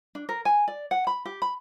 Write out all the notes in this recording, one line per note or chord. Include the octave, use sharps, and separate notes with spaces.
D4
A#4
G#5
D5
F#5
B5
G4
B5